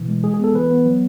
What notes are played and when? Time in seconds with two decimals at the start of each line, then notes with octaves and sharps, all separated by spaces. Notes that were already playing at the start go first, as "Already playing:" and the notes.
Already playing: B2 E3
0.08 G#3
0.23 G#3 G#4
0.34 G#4
0.39 B3 A4
0.54 E3 B4
0.71 B3
0.86 F#3